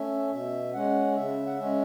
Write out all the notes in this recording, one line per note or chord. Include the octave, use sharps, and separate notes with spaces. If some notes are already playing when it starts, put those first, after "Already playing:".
Already playing: A3 C#4 E5
B2 E5
G#3 C#4 F#5
C#3 E5
F#5
G#3 C#4 E5